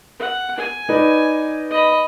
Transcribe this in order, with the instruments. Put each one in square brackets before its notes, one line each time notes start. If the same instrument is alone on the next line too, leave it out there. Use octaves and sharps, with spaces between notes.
[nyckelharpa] F#5
G#5
[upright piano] D#4 B4 D5
[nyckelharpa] D#5 B5